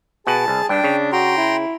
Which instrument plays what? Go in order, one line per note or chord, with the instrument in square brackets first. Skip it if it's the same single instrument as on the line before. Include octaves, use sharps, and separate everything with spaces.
[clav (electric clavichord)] B2 F#5 [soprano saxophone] G#4 [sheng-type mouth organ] A5
[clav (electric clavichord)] C2 [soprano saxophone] G#4
[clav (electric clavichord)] G2 [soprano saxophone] D4 [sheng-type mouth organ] G5
[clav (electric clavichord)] C#3
[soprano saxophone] F#4 [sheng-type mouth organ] G5 A#5 C6
[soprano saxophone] E4